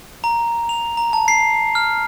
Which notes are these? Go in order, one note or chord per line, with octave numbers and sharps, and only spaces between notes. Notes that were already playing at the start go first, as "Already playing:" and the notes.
A#5
F7
A#5
A5
C7
F6